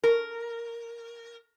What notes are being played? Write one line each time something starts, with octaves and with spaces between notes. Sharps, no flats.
A#4